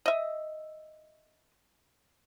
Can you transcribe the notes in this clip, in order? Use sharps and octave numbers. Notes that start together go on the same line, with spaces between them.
D#5 E5